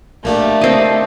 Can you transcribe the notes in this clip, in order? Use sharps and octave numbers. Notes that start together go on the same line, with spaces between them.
A3 A#3 D4 G4
C4 D#5